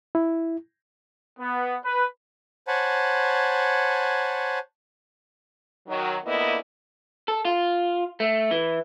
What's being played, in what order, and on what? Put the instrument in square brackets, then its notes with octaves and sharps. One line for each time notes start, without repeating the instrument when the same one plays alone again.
[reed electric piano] E4
[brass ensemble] B3
B4
[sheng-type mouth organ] C5 C#5 F#5 G#5 A5 B5
[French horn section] D#3 F#3
D2 A#2 A#3 B3 E4 D#5
[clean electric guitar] A4
F4
A3
E3